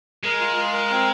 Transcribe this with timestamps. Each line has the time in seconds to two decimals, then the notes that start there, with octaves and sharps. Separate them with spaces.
0.24 G#3 A#4
0.40 F4
0.56 F4
0.73 A#4
0.90 C4